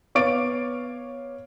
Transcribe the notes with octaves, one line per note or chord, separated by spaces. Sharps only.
B3 C#5 F5 D6 A6 D7